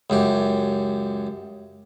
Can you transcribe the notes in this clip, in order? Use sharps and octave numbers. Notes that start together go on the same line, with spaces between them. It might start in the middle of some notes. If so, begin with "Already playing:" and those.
C#2 F#2 G4